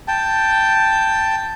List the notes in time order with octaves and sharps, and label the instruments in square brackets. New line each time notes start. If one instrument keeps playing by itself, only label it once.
[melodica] G5 A5